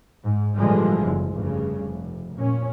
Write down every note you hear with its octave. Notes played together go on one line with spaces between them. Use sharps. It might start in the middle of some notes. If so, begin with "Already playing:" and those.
G#2
A#2 D3 E3 F3 G3 G#3
F#1
F1 G2 C#3
F1
A#2 C#4